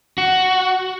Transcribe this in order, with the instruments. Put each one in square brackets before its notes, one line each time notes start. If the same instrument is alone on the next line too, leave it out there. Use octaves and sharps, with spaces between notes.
[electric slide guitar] F#4